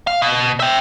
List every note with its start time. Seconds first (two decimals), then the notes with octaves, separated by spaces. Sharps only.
0.07 F5
0.22 B2
0.60 E5 G5